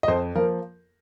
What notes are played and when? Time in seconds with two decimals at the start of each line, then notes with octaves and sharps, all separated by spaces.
0.03 D#5
0.08 F2 C5
0.35 F3 A#3 A#4